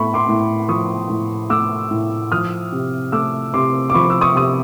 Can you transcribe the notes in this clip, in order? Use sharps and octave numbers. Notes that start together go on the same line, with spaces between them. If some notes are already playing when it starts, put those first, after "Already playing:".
Already playing: A2 A3 B5 C#6
C6 D6
A2
F3 C#6 D#6
A2
A3 D6 E6
A2
F3 D#6 F6
C3
A3 D6 E6
C3 C6 D6
D6
F3 B5 C#6
E6
C#6 D#6
C3 D#6